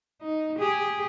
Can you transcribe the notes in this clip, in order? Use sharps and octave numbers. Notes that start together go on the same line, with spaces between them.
D#4
G4 G#4